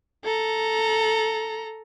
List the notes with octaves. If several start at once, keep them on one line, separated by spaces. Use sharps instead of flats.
A4 A#5